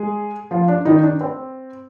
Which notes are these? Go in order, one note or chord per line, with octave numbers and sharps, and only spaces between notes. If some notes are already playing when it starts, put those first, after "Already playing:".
Already playing: G#3 G#4
F3 F4
D4
D#3 D#4
D4
C4